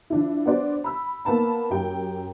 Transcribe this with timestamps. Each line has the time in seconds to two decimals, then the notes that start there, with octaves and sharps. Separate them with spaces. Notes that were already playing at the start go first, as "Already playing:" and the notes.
0.10 F3 D4 E4
0.46 B3 D4 F#4 C5 D5
0.84 B5 E6
1.25 A#3 B3 A5 B5
1.70 F#2 G4 G5